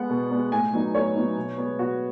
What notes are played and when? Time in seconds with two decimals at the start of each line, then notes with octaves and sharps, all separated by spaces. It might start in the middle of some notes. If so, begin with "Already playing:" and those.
Already playing: G#3 B3 F#5
0.09 B2
0.31 G#3 B3
0.51 A2 G#5
0.73 F#3 B3 D#4
0.94 A2 C#5
1.15 F#3 B3 D#4
1.37 B2
1.58 G#3 B3
1.79 B2 F#4